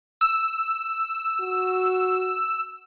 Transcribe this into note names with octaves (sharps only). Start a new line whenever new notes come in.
E6
F#4